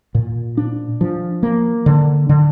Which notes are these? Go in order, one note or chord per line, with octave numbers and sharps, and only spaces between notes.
A#2
D4
F3
A#3
D3
D3